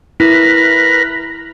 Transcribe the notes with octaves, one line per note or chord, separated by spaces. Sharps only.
E4 A#4 B4